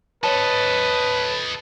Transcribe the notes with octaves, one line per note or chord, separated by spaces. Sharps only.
A4 B4 C#5 D#5 A5